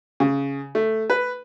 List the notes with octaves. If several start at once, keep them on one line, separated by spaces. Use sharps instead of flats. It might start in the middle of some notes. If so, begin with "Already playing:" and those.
C#3
A3
B4